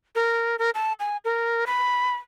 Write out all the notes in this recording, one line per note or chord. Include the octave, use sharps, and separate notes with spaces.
A#4
A#4
A5
G#5
A#4
B5